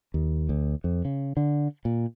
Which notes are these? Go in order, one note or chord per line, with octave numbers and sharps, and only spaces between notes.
D#2
D2
F2
C#3
D3
A#2